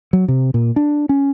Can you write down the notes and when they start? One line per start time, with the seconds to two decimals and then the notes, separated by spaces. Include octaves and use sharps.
0.13 F#3
0.28 C3
0.54 A#2
0.76 D4
1.09 C#4